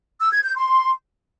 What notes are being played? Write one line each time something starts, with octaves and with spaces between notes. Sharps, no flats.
E6
G#6
G6
C6